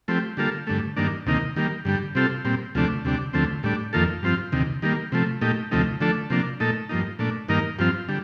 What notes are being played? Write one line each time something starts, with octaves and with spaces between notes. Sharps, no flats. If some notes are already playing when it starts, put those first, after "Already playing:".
F3 A3 C4 G4
D3 G3 A#3 F4 A4
G2 D3 A3
G2 D#3 A#3 D4
D2 C3 D#3 A#3 D#4
D#3 G3 A#3
G2 D3 G3
C3 G3 C4 F4 A4
A#2 G3 C4
D2 C3 F3 A3 D4
D2 C3 G3 D4
D2 D3 F3 A3 C4
A2 G3 D4
F2 D#3 A#3 F4 A4
G2 F3 C4 F4
D2 C3 D#3
D#3 G3 A#3
C3 F3 A3
A#2 A3 D#4 G4
D2 C3 F3 A3 D#4
D3 F3 A3 D4 A4
C3 F3 A#3 D4
A#2 A3 D#4 A4
G2 F3 A#3 D#4
A#2 A3 D4
G2 D#3 A#3 D#4 A#4
G2 F3 C4 F4
D3 G3